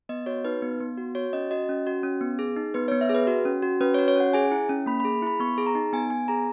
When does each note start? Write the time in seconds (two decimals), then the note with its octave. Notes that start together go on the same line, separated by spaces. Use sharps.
0.09 B3 D#5
0.26 F#4 C#5
0.45 D#4 B4
0.62 B3
0.80 B3
0.98 F#4
1.15 F#4 C#5
1.33 C#4 D#5
1.51 F#4 D#5
1.69 C#4
1.86 F#4
2.03 C#4
2.21 B3
2.39 G#4
2.56 D#4
2.74 B3 B4
2.88 C#5
2.92 B3
3.01 E5
3.10 G#4
3.15 B4
3.27 F#4
3.45 C#4
3.62 F#4
3.81 C#4 B4
3.94 C#5
3.98 F#4
4.08 C#5
4.16 C#4 F#5
4.33 G#4 G#5
4.52 E4
4.69 C#4
4.86 A#3 B5
5.00 B5
5.05 G#4
5.22 E4 B5
5.40 B3 C#6
5.58 G#4
5.67 A#5
5.75 D#4
5.93 B3 G#5
6.10 B3 G#5
6.28 G#4 A#5